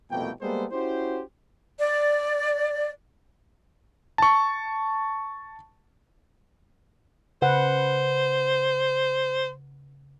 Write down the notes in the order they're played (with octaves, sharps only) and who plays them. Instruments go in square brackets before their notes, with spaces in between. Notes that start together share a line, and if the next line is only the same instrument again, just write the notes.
[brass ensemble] C2 F2 B2 A3 A#3 G5
G3 G#3 A#3 B3 A4 C5
C#4 E4 F#4 G4 C5
[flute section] D5
[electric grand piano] A5 C#6
[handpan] C#3 B4 F#5 [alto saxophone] C5